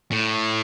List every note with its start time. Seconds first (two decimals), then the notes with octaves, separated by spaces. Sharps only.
0.12 A2